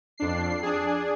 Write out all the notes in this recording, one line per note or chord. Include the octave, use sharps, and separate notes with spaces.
F2 D4 C7
D4 G#4